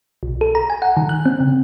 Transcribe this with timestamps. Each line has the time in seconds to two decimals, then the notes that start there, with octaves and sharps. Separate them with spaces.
0.23 B1
0.41 A4
0.55 A#5
0.70 G#5
0.82 F#5
0.97 D#3
1.09 F#6
1.26 C4
1.40 C#3